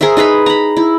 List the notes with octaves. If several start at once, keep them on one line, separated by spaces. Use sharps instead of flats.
G#4 A#4 C5 E5
D#4 G#4 B4 B5
A#5 B5
E4